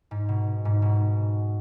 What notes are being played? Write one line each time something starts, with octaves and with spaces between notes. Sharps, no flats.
G#2
B2
G#2
B2